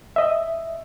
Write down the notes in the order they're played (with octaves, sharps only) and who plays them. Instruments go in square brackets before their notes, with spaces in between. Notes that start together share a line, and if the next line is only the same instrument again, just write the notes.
[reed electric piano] D#5 E5